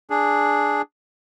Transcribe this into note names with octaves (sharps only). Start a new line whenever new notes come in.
D4 G#4